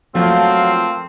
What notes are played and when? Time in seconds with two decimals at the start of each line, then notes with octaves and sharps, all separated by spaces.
0.15 F3 F#3 A3 A#3 C4 F4 F5